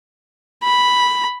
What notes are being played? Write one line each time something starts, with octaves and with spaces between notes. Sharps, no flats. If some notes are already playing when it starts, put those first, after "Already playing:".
B5